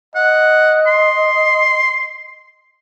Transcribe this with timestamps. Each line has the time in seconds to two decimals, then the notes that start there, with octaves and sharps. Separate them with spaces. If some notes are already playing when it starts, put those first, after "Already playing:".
0.15 D#5 F#5
0.87 C6